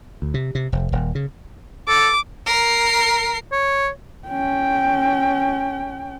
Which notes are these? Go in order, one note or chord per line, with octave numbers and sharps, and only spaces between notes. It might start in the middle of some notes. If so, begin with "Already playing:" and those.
D2
C3
C3
F1
D#1
C#3
A4 D6
A#4 C7
C#5
C#4 G5